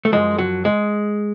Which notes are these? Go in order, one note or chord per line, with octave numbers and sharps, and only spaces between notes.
A3
F#2 F3 G#3
F#3
G#3